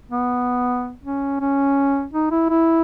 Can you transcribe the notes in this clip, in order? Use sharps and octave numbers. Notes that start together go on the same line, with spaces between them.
B3
C#4
C#4
D#4
E4
E4